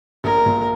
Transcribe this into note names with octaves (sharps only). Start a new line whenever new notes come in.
A#1 A#4
A#2